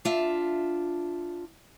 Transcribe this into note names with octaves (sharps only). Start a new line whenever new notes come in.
D4 F4 E5